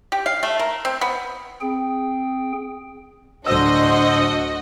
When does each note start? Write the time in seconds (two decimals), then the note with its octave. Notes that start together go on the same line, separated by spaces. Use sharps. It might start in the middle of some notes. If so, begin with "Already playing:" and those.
0.12 G4
0.26 F5
0.43 A3
0.59 A#4
0.85 C4
1.01 B3
1.61 C4 G#4 G5
3.46 D1 D4 F#4 C5 D#5 E6